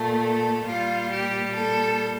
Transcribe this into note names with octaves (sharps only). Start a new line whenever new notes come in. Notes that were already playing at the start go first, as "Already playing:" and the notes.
Already playing: A#2 A3
A4
A#2 G3 F4
G4
A4